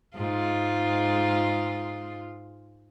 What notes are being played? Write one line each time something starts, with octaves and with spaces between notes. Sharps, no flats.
G#2 G#3 F4